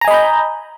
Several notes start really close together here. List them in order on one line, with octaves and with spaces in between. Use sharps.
A#5 G#5 D#5 B5 G6